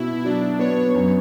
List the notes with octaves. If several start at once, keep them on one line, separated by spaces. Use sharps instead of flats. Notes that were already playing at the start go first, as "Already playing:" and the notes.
Already playing: B2 E4 F#4
F#3 D4
B3 C#5
F#2